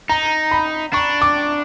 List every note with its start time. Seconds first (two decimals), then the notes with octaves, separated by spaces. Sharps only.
0.09 D#4 A#5
0.51 B5
0.93 D4 C#6
1.22 D6